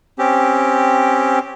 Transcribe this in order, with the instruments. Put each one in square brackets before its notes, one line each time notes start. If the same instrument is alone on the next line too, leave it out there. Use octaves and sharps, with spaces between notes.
[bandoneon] C4 C#4 G4